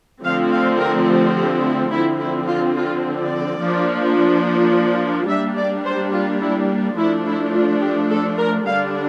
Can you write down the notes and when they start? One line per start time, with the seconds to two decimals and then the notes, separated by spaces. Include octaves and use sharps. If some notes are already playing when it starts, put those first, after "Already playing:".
0.23 D3 F3 A3 C4 F5
0.52 F5
0.79 A#4
1.07 G4
1.36 G4
1.63 E4
1.91 D3 F3 C4 E4
2.20 E4
2.48 F4
2.76 F4
3.19 D5
3.61 F3 A#3 D4
5.29 G3 A#3 D4 E5
5.57 D5
5.85 C5
6.13 F4
6.42 E4
6.98 F3 A3 D4 E4
7.26 E4
7.54 F4
7.81 G4
8.10 A4
8.39 A#4
8.66 D3 G3 D4 F5